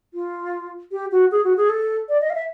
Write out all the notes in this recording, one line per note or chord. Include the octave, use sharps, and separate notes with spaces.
F4
G4
F#4
G#4
F#4
G#4
A4
D5
D#5
F5
E5